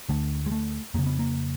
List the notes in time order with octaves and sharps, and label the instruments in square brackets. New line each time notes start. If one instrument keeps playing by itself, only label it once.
[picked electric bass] D2 D3 A3
G#3
A3
F2 C#3 A#3
B3
A#3